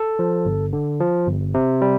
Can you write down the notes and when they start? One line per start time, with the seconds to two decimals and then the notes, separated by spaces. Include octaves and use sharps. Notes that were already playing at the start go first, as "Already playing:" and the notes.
Already playing: A4
0.19 F3
0.45 G1
0.73 D3
1.00 F3
1.27 G1
1.54 C3
1.82 G3